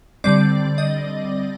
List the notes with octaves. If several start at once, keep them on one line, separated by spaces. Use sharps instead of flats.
D3 G3 C4 D5
D#5